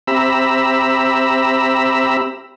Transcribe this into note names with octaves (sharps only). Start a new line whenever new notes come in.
C4 G4 E5 A#5 B5 E6